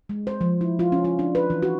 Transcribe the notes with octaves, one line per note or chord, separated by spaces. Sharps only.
G#3
C5
F3
E4
F4
C#4
F4
D4
B4
E3
F#4